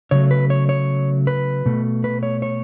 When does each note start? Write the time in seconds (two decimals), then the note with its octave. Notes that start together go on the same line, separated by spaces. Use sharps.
0.11 C#3 F#3 A3 C#5
0.31 B4
0.50 C#5
0.69 C#5
1.27 B4
1.66 B2 A3
2.04 B4
2.23 C#5
2.42 C#5